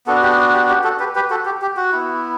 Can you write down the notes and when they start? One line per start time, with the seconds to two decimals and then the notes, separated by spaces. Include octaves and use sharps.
0.07 B3 D4 F#4 A4
0.22 G4
0.53 G4
0.70 G4
0.84 F#4 A4
1.00 G4 B4
1.15 G4 B4
1.30 F#4 A4
1.46 G4
1.62 G4
1.77 F#4
1.92 B3 E4